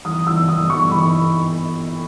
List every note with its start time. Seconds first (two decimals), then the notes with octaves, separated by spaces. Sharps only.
0.05 E3 D#6
0.27 E3 E6
0.48 E3 D#6
0.70 E3 C#6
0.91 E3 B5